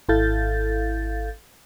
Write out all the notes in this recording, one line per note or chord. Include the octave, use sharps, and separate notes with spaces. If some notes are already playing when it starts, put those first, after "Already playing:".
G#1 E4 A4 F5 G6 A6